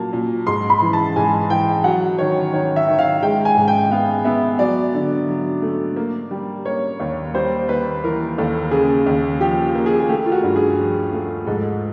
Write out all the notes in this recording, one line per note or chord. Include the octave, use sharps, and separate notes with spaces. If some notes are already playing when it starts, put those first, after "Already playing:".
Already playing: A#2 F#3 A#3 A5
A#2
G#2 C6
B5
E3
A5
G#2 G#5
E3 G5
F#3 F#5
D#3 C#5
D#3 C#5
E5
D#3
F5
G#3 G5
G#5
G#2
G5
B3 F5
B3 E5
F#3 D5
D3
F#3
A3
A#3
G3
A#3 C#5
D#2 C#5
G3 C5
D#2 B4
E3 A#4
D#2 A4
C#3 G#4
D#2
F3 G4
A#3
G#4
G#4
A3 G4
F4
F#4
G2
G#4
F3
A3
G#2 A4